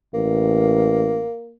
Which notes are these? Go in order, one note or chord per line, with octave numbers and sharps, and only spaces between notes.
A1 A#3